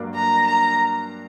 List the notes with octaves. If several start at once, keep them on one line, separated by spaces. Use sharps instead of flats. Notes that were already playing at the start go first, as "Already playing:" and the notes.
Already playing: G2 F#3 A#3 D4
A#5
A#5